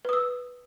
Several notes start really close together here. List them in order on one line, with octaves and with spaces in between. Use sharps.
B4 D#6 E6